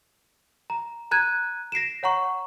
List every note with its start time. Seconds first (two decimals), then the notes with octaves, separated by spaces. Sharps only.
0.70 A#5
1.11 A#5 F#6 G#6 D#7
1.72 A#6 C7 D7 E7
2.03 C#5 F#5 A#5 C#6